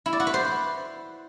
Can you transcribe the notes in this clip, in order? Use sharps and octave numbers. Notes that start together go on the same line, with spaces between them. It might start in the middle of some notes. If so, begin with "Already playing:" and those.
E4
D5
F#4
B4
C5